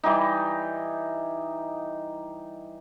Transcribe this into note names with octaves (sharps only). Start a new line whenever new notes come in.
E3 G3 D#4